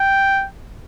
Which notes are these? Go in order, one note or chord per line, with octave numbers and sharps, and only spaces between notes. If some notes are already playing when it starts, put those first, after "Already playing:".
Already playing: G5